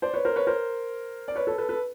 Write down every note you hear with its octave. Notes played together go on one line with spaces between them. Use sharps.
C5 D5
B4 C#5
A#4 C5
B4 C#5
A#4 C5
D5
B4 C#5
A4 B4
A4 B4
A4 B4